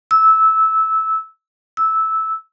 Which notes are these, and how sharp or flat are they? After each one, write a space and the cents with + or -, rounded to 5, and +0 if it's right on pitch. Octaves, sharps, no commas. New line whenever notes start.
E6 -15
E6 -10